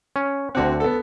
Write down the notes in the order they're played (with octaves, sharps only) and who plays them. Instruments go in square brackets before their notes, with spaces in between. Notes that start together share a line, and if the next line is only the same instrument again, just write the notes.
[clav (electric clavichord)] C#4
[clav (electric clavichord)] D2 D3 F#5 [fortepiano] C4 F#4
[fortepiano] B3 A4